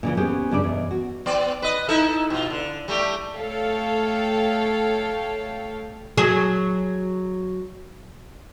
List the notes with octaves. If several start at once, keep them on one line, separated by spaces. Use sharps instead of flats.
A#2 C#3 E3
B3 C#4 G4 G#4 C5 C#5
G2 C#3 G3 D5
E2 B2
F#4
B3 D5
B4 D#5
D#4 E4 A4
B2 F4
D3
G3 A3 G4
A3 A4 C#5 F5 G5
F#3 G#4